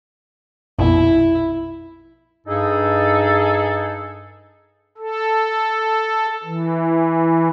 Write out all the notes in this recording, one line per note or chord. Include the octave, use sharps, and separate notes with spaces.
A#1 F2 B2 E4
G2 D#4 G#4 A4
A4
E3